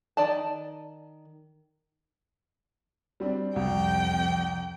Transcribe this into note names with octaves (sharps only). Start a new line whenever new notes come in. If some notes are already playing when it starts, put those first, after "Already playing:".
D#3 D5 A5
G3 C4 D4
C2 F2 G5